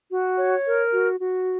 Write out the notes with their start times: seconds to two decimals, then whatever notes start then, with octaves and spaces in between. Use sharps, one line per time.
0.11 F#4
0.38 C#5
0.65 A#4
0.92 F#4
1.20 F#4